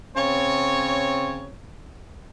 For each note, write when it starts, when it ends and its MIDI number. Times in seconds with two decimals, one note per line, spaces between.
0.17 1.57 49
0.17 1.57 60
0.17 1.57 73